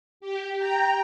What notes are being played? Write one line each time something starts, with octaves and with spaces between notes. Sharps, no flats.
G4
G5 A#5